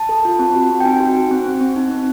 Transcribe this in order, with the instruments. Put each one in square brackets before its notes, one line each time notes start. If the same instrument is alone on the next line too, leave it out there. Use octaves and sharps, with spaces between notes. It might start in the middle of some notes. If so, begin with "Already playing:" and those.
Already playing: [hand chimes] A5
A4
F4
C4
F#4
C4
G5
D#4 G#5
F#4
F#4
C4
C4
C4
D#4
C4